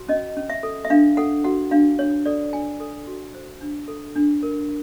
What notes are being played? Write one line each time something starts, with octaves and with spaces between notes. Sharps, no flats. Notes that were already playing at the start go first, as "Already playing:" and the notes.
Already playing: F#4
C#4 D#5
C#4
E5
A4
E5
D4 F5
A4 F#5
F#4 F#5
D4 F5
D4 C#5
A4 D5
D4 G#5
A4
F#4
C5
D4
A4
D4
A#4